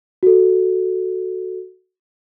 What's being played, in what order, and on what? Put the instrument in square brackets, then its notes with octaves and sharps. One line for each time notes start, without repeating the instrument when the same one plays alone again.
[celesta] F#4 A4